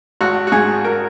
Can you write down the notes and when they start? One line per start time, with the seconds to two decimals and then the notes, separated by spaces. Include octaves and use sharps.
0.21 G#1 F#4
0.47 F#4
0.52 G#2 G#4
0.85 A#4